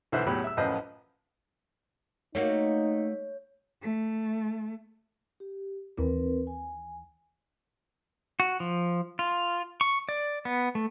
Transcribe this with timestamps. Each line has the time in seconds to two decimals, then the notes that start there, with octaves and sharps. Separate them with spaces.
0.12 B1 D3 E3 C5 E5 F#6
0.27 E2 A2 F#3 G4 B5
0.44 E5 E6
0.57 A1 F#2 F3 B4 C5 D#5
2.35 A3 A#3 D#4 F#4 C#5
3.81 A3
5.40 G4
5.97 D#2 E3 C4 A#4 B4
6.47 G#5
8.40 F#4
8.60 F3
9.19 F4
9.81 C#6
10.09 D5
10.45 B3
10.75 A3